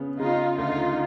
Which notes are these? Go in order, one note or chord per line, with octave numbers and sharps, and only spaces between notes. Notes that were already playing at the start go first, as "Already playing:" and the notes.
Already playing: C#3 B3
C#3 D#4 F4
D2 D#4 F4